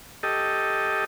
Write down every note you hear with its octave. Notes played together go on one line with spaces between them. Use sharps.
G4 A4 D#5